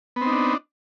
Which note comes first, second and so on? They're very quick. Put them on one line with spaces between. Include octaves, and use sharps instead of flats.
B3 C4 D#4 D4